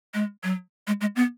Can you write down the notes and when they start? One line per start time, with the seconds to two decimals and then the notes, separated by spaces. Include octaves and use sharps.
0.14 G#3
0.44 F#3
0.87 G#3
1.01 G#3
1.16 B3